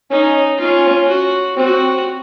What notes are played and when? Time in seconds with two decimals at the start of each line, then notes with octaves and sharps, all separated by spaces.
0.11 C#4 D#4
0.60 C#4 F4
1.08 F#4
1.57 C4 F#4